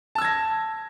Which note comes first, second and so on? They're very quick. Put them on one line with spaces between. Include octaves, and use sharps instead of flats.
A5 E6 G#6 A#6